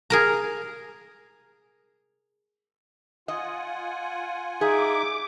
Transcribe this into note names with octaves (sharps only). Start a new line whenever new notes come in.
G#4 A#4 A#5
F4 D#5 F#5 G#5
D#4 G#4 E5 D6